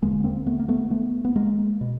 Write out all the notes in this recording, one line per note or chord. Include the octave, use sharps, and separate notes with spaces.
E1 D#2 D3 G#3 A#3
B3
A#3 C4
A3 B3
A#3
A3 B3
A3 B3
B3
G#3 A#3
B2